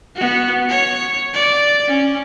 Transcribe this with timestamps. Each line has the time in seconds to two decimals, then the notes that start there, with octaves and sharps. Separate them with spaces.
0.16 B3 F#4
0.69 C#5
1.34 D5
1.87 C#4